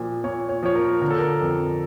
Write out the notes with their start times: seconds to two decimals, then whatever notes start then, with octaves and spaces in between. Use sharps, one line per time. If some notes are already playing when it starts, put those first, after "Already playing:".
Already playing: A#2 F3
0.24 A#2 C#5
0.49 C#5
0.63 F3 C#5
0.75 A#4
1.01 D3 A#4
1.11 A4
1.19 A#4
1.41 F2